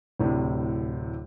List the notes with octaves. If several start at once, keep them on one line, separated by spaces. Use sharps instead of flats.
D1 A2 C3 D4